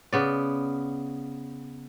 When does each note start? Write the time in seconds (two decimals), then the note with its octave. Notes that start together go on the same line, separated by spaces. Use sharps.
0.13 C#3 B3 D5